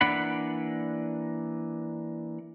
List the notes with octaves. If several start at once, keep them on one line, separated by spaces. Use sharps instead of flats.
E3 A#3 D4 F#5 B5